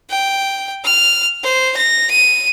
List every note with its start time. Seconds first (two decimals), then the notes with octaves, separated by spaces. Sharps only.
0.10 G5
0.85 F6
1.43 C5
1.77 A#6
2.11 D#7